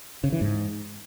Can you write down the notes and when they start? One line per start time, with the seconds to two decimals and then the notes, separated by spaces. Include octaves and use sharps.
0.24 C#3
0.32 E3
0.41 G#2